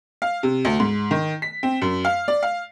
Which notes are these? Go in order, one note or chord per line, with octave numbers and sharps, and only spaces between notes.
F5
C3
D2
G#2
D#3
B6
C4
F#2
F5
D5
F5